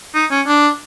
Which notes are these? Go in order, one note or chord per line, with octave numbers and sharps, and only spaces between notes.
D#4
C#4
D4